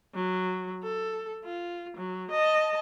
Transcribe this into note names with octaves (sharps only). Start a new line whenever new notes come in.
F#3
A4
F4
F#3
D#5 A5